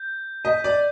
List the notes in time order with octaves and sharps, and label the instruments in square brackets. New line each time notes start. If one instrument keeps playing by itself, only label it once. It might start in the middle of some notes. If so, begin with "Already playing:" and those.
Already playing: [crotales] G6
[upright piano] D#5 [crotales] G6 B6 D#7
[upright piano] D5